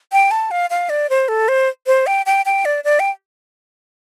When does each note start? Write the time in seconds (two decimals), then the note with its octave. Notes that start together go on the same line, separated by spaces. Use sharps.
0.12 G5
0.31 A5
0.51 F5
0.70 F5
0.89 D5
1.10 C5
1.28 A4
1.48 C5
1.87 C5
2.07 G5
2.26 G5
2.46 G5
2.65 D5
2.84 D5
2.99 G5